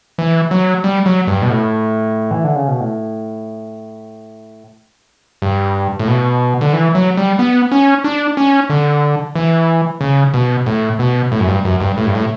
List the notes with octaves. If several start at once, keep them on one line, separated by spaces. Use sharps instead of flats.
E3
F#3
G3
F#3
G2
B2
A2
E3
D3
C#3
B2
A2
G2
A2
B2
D3
E3
F#3
G3
B3
C#4
D4
C#4
D3
E3
C#3
B2
A2
B2
A2
F#2
G2
F#2
G2
A2
G2
A2